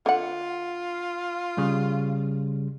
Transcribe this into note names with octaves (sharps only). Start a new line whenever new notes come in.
D3 F4 F#5
C#3 G3